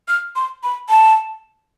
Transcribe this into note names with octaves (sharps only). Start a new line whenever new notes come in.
F6
C6
B5
A5